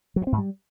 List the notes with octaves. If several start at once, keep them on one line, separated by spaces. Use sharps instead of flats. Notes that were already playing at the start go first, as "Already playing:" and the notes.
F#3
G2
C4
G#2
G3